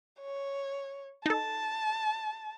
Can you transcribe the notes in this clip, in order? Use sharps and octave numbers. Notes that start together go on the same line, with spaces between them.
C#5
D#4 A4 A5